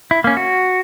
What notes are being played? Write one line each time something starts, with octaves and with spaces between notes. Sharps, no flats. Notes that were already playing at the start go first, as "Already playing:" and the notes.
E4
A#3 C#4
F#4